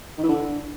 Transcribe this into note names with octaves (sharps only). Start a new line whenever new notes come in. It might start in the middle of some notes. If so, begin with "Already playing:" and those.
D#3
E3
D3